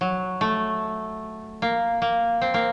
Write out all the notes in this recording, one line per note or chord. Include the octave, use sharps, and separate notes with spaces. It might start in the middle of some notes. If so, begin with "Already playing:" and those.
F#3
A3
A#3
A#3
C4
A#3